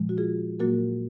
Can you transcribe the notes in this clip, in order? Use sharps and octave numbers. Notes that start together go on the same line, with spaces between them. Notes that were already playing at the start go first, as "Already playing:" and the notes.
Already playing: A#2 F3 G#3
F#4
F4 G#4
A#2 F#3 A#3 F#4 A#4